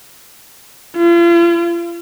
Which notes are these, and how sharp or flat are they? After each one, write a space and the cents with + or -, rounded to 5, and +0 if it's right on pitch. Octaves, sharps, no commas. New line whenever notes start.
F4 -40